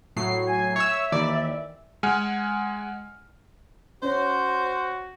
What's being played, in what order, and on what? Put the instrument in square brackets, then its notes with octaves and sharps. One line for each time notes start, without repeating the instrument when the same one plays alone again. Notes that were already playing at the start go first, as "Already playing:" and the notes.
[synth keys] A2 F#3 C7
[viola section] G#5
[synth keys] C#5 E6 [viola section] E5
[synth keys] D#2 E3 D5
[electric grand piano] G#3 F#5 G#5 F6
[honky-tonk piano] C#4 [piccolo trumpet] F#4 [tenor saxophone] C5